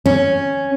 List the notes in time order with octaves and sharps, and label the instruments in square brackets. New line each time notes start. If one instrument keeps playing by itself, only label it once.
[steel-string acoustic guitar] C#4